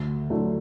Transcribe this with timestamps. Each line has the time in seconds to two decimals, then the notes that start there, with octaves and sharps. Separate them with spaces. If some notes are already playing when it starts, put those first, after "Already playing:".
Already playing: D2
0.30 D3 F#3 A3 E4